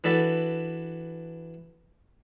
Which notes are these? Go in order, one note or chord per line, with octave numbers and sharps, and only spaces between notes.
E3 D4 F#4 A4 B4 D5